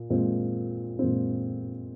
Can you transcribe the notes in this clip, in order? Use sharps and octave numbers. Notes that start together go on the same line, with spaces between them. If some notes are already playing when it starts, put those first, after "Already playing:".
Already playing: A#2
A#2 G#3 C4
A#2 G#3 C4